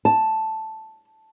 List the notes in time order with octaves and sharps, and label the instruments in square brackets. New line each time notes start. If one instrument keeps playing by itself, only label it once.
[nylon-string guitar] A5